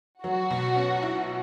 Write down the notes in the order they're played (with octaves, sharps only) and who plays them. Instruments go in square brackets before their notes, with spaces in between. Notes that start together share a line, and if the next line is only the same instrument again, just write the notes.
[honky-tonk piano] F#3 [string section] F#4
[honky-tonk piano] B2
C#4
E4